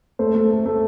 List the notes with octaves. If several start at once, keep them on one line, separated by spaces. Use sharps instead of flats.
A3 C5
A3
A3
A3